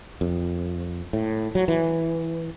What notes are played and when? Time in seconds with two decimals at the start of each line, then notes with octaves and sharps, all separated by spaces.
0.21 F2
1.13 A2
1.55 F#3
1.68 E3